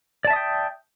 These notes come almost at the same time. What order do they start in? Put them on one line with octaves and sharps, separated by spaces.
D5 A5 E5 D#6 G5